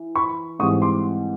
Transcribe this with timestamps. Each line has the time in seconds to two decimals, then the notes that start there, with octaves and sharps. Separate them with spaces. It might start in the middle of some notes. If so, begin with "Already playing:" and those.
Already playing: E3
0.15 B5 C#6
0.59 G#2 E3 G3 C4 C#6 D#6
0.82 C6 D6